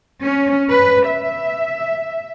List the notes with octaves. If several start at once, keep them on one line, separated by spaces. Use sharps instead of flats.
C#4
B4
E5